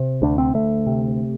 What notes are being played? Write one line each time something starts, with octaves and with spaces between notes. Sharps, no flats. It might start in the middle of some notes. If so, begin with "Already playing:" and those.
Already playing: C3
D2 D4
C4
D2 A3
C3